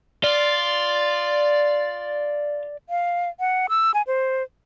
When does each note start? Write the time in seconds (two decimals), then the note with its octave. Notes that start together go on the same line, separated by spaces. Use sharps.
0.24 F4 D5
2.89 F5
3.40 F#5
3.69 E6
3.94 G#5
4.07 C5